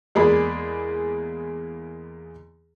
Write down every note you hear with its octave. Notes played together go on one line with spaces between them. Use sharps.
E2 G#3 A#3 G#4 D5 B5